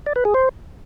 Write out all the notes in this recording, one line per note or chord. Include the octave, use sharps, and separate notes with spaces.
D5
B4
G#4
C5